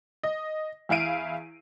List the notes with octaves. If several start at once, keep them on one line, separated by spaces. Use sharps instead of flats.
D#5
E2 E4 F5 D7 D#7